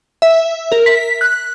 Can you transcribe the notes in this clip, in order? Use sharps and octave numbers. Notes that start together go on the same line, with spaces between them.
E5
A#4
B6
F#6